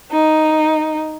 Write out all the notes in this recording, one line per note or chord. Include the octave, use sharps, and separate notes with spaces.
D#4